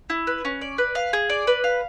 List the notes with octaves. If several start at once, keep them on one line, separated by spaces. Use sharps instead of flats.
E4
B4
C#4
D5
B4
F5
G#4
D5
B4
F5